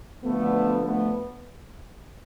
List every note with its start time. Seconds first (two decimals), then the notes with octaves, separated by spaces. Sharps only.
0.24 D2 D3 F3 A3 B3
0.84 A3 B3